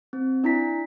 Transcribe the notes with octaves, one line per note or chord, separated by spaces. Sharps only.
C4
D4 E4 A#5 B6